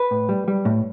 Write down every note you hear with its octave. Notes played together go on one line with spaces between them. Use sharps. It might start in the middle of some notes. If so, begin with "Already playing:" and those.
Already playing: B4
A2
G3
G3
A2